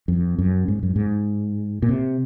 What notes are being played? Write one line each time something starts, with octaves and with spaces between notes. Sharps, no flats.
F2
F#2
G#2
F#2
G#2
A#2
C3